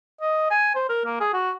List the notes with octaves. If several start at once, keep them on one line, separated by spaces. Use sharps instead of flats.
D#5
G#5
C5
A#4
A#3
G#4
F#4